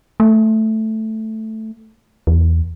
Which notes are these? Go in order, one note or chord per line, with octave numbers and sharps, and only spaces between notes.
A3
E2